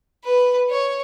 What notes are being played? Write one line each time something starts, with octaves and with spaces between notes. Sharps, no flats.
B4
C#5